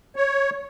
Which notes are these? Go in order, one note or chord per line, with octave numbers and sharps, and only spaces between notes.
C#5